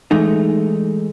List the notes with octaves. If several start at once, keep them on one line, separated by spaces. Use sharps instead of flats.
E3 G#3 A3 D#4